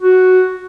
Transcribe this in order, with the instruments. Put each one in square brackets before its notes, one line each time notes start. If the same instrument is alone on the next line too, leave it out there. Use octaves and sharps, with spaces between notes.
[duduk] F#4